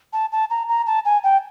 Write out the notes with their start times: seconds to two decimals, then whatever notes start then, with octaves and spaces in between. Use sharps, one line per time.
0.13 A5
0.32 A5
0.50 A#5
0.69 A#5
0.87 A5
1.05 G#5
1.24 G5